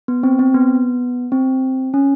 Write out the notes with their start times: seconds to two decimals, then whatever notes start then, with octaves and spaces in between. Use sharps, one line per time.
0.08 B3
0.23 C4
0.39 C4
0.54 B3
1.32 C4
1.94 C#4